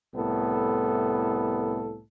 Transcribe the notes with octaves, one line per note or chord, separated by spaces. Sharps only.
C2 A2 B3 A4